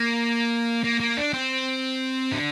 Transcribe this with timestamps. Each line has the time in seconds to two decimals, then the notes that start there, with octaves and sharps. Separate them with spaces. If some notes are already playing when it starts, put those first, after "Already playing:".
Already playing: A#3
0.84 A#3
1.00 A#3
1.17 D4
1.33 C4
2.32 D3